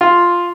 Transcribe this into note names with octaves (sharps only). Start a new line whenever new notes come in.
F4